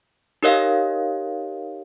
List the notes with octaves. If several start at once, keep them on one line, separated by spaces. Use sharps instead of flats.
D#4 G4 A#4 C#5 D#5 F5